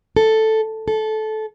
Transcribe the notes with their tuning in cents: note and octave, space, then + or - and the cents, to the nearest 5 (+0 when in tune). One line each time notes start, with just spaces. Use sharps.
A4 +0
A4 -20